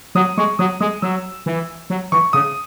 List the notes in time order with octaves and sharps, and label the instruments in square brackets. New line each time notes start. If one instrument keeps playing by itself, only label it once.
[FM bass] F#3 [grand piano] D#6
[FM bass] G#3 [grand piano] C#6
[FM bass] F#3 [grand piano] D#6
[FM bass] G#3 [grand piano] D#6
[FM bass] F#3 [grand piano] E6
[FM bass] E3
F#3
[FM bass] E3 [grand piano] C#6
[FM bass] C#3 [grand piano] D#6